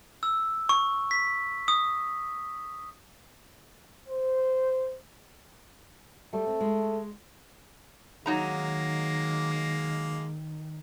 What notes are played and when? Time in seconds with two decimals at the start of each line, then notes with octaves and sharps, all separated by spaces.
0.23 E6
0.69 C#6
1.11 B6
1.68 D#6
4.08 C5
6.33 G3 A3
6.47 C4
6.60 G#3
8.26 D#3 F#3 G#3 A#3 D#4 A#5